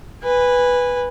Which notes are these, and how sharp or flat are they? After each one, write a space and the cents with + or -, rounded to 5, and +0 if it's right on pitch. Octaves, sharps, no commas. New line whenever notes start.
B4 +0 G#5 -20